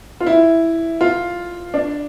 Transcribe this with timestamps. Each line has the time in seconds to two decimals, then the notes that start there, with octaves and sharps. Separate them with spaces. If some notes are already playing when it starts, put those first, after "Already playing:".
0.20 F4
0.26 E4
1.01 F4
1.74 D4